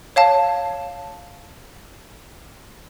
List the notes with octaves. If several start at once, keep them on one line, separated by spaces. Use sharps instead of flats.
C#5 F5 A5